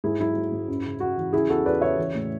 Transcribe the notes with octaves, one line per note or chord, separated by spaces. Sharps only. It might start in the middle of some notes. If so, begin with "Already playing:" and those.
G#2 E4 G#4
F#3 E4
F#3
G#2
F#2
C#3
F#2 F#4
E3
C#3 E4 G#4
E2 F#4 A4
E2 B4 D5
C#3 C#5 E5
E3
A2